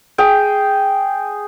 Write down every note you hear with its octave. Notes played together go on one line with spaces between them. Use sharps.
G#4 G5